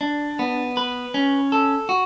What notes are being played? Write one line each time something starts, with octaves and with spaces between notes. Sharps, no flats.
D4
B3
B4
C#4
A4
F#4